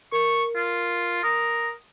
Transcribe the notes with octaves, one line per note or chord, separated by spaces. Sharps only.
A#4 C#6
F4
A#4 D#6